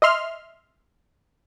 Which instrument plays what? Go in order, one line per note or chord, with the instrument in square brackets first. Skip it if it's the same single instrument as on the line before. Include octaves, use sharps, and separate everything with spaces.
[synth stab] D#5 E5 C6 F6